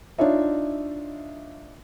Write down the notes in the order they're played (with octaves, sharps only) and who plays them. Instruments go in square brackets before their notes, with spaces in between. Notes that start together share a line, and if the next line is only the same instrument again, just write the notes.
[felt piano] D4 D#4 F4 C#5 D#5 E5